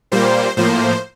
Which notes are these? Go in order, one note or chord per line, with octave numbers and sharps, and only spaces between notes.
A#2 G3 A#3 C5
A2 F3 A#3 C5